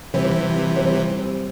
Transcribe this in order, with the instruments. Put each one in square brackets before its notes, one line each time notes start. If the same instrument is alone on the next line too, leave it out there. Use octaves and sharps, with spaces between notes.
[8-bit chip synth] C3 E3 [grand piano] G3 C4 G4 C5
[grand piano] G3 C4 G4 C5